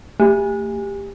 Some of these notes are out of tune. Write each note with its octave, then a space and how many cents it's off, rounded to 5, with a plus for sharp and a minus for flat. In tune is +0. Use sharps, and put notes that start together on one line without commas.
A3 +35 G4 +20